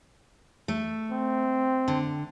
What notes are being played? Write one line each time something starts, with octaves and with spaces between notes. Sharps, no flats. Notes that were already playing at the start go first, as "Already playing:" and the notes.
A3
C4
D3